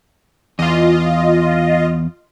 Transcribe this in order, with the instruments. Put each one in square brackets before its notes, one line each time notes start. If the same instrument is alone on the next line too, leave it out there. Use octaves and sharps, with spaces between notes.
[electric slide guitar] E2 [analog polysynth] F4 D#5